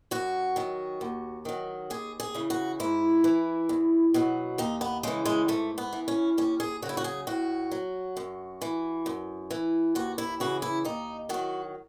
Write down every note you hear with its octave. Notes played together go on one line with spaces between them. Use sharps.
F#2 F#4
D#3 F#3
D#2
D#3 F#3
D#2 G#4
G#4
C#3 E3
F#4
G#2 E4
E3
E2
B2 F#3
D#2 D#4
B3
C#3 E3 G#3
G#3
G#2 A3
B3
E3
C#4
D#2 C#4
G#4
C#3 F#3 E4 F#4
F#4
G#4
A2 F#4
F#3
F#2
E3
F#2
E3
D#2 F#4
E4
C#3 E3 F#4
E4
D#2 D#4
D#3 F#3 F#4